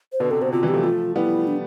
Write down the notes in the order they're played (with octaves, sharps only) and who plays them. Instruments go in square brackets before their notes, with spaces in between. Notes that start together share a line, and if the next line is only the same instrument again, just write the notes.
[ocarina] C5
[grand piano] B2 D3 [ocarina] B4
[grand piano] C3 [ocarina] A4
[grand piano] B2 [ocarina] C5
[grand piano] C3 [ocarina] F4
[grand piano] E3 G3
[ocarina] G4
[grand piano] F3 A3
[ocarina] F4
[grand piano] G3 B3 [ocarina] E4
[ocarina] D4